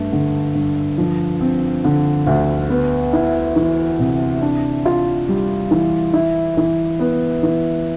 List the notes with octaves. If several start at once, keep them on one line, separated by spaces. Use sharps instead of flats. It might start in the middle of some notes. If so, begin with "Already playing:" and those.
Already playing: G2 A3
D3
G2
F3
C4
D3
D2
B3
E4
E3
C3
D4
F4
G3
E3
E4
E3
B3
E3